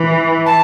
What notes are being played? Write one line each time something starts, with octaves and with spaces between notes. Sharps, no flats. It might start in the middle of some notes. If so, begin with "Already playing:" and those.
Already playing: E3
A5